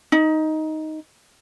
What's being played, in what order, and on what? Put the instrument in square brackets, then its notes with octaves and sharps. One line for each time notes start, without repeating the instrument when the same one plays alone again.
[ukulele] D#4